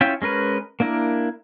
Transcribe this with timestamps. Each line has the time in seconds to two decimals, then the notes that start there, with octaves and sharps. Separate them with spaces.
0.01 C#4 E4 F4 E5 G5
0.22 G#3 C#4 A#4 B4
0.80 A#3 D4 E4 A#4